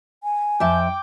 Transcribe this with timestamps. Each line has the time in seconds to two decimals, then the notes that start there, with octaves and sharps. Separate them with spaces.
0.23 G#5
0.60 F2 E5 G5 A5 D6